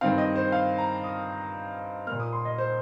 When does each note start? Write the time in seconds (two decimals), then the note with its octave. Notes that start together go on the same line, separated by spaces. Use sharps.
0.01 G2 D#3 C4 F5
0.18 D#5
0.36 C5
0.52 F5
0.78 A#5
1.04 D#6
2.07 A#3 F6
2.12 A#2
2.20 D#6
2.33 C6
2.45 D#5
2.58 C5